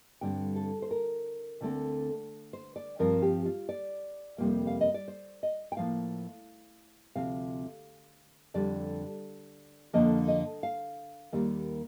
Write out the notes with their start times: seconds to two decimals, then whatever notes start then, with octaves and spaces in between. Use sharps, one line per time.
0.21 G2 D3 G3 C4 G5
0.56 A4
0.82 C5
0.91 A#4
1.61 D2 D3 A3 C4
2.53 C5
2.76 D5
2.99 G2 F3 C4 A#4
3.22 G4
3.46 F4
3.69 D5
4.38 F2 C3 G3 A#3
4.67 F5
4.81 D#5
4.94 D5
5.08 C5
5.43 D#5
5.72 G5
5.77 A2 F3 A#3 F5
7.16 D2 C3 F3 C4 F5
8.54 F2 D3 G3 D5
9.93 F2 D3 F3 A#3 D#5
10.28 D#5
10.63 F5
11.33 D#2 D#3 G3 A#3